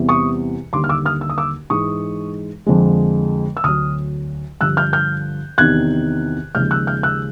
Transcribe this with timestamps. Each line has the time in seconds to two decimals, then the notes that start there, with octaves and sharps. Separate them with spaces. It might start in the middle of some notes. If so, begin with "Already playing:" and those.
Already playing: E2 C3 E3 G3
0.09 C#6 D#6
0.73 D#2 D3 G3 C6 D6
0.84 F6
0.89 D6 E6
1.05 D#6 F6
1.21 E6
1.30 D#6
1.38 D6 E6
1.70 G#2 E3 G#3 C#6 D#6
2.66 F2 D3 F3 G#3
3.57 E6
3.64 D2 D3 F#3 D#6 F6
4.61 G2 D3 F3 E6 F#6
4.77 F6 G6
4.93 F6 G6
5.58 E2 C3 D#3 F#6 G#6
6.55 D#2 C#3 F3 G#3 F6 G6
6.71 E6 F#6
6.87 F6 G6
7.03 E6 F#6